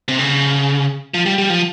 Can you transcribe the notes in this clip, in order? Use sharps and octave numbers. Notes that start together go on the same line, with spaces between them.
C3
C#3
F3
G3
G3
F3